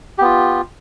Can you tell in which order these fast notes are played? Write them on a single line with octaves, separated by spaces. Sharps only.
G4 B3 F4